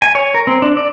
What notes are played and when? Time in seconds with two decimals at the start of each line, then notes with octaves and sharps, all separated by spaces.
0.02 G#5
0.15 C#5
0.34 A#4
0.47 C4
0.62 D4
0.77 D5